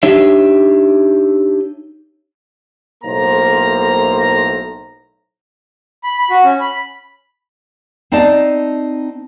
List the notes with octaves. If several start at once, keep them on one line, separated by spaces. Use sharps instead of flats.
D4 D#4 G4 C#5 E5
B1 A2 A#3 C5 A#5
B5
B5
F#4
C#4
B5
C4 D#4 D5 D#5 A5